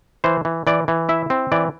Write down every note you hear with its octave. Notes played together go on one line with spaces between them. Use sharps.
E3 C5
E3
E3 D5
E3
E4 E5
C4
E3 D5